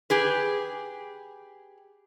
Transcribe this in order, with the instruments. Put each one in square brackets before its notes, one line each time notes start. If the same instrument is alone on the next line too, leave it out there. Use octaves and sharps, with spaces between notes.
[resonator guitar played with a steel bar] G4 G#4 B4